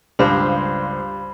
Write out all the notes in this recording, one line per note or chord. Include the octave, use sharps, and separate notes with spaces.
C#2 G2 G3 C5 F5 B5